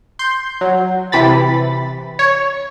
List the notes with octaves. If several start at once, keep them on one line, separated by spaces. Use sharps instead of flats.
C6 G6
F#3
C3 E3 B5 A6
C#5